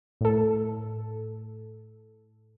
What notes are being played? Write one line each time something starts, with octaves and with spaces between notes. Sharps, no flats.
A2 A4